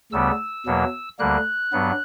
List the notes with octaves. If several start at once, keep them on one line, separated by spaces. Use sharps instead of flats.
D2 C#3 G3 B3 E6
E2 B2 F#3 A#3
D2 D3 G3 A#3 F#6
G2 F#3 B3